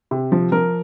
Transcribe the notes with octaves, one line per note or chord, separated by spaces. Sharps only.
C3
F3
F3 A#4